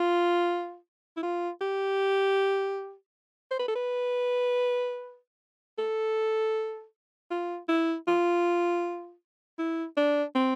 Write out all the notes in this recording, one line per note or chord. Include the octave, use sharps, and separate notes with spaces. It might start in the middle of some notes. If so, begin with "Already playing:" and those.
Already playing: F4
E4
F4
G4
C5
B4
A4
B4
A4
F4
E4
F4
E4
D4
C4